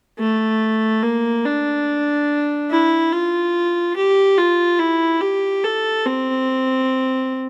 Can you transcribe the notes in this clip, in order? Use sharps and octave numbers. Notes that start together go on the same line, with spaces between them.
A3
A#3
D4
E4
F4
G4
F4
E4
G4
A4
C4